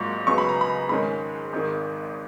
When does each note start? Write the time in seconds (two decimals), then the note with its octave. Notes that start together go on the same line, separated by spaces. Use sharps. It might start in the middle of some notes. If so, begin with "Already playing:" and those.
Already playing: G#1 G#2 F#3 A#3 F4 C#6
0.27 C#2 C#3 F#3 B3 C#6
0.38 B5
0.49 A#5
0.61 B5
0.89 G#2 D#3 G#3 C#4 B5
1.53 G#1 G#2 D#3